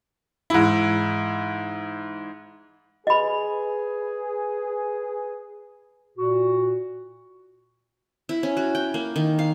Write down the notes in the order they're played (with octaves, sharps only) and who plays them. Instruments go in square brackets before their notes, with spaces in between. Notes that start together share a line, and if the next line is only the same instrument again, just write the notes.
[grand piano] G#2 E3 E4
[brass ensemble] G#4 B4 [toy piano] D#5 B5
[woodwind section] A#2 F#4
[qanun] E4
C#4
F#4
G5
A#3
D#3
F5